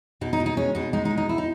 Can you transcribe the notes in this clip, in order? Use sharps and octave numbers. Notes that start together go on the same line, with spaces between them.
B2 D#4
D#4
B2
D#4
G#3 C#4
B2 D#4
G#3 D#4
D#4
B2
D#4
E4
D#4